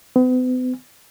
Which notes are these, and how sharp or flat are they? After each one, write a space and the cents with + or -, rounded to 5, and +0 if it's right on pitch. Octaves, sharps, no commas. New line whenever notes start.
B3 +45